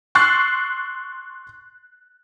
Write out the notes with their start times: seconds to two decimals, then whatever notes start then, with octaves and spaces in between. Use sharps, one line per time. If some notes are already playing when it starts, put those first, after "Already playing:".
0.15 C6 C#6 E6 F#6 A6 C7